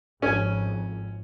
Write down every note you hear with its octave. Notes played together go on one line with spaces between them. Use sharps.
G#1 F2 C#4 G#5